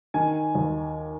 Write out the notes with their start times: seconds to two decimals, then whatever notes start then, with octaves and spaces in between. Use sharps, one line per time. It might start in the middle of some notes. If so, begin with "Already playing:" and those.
0.14 D#3 G#5
0.55 D#2